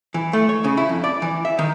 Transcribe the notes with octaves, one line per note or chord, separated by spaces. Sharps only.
E3
A3
C#5
C#3
E4
F2
D5
E3
E5
D#3